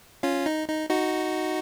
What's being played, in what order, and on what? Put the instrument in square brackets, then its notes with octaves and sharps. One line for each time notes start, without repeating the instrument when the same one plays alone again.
[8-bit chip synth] C#4 F4
D#4
D#4
D#4 F#4